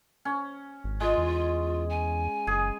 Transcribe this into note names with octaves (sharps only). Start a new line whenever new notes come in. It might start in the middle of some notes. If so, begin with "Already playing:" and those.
C#4
G#1
G#3 F4
E2
G#5
F#1 G#4